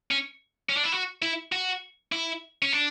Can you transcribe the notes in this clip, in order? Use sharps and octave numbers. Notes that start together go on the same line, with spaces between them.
C#4
C#4
D4
E4
F#4
E4
F#4
E4
C#4
D4